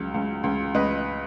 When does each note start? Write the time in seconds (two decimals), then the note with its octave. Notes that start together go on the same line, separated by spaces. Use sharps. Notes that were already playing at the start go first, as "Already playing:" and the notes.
Already playing: C#2 F#3
0.14 C#2
0.44 C#2
0.74 C#2 B4 D#5